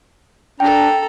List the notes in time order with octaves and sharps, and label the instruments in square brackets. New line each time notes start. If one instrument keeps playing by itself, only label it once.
[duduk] D4 [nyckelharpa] A4 A#5 [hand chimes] G5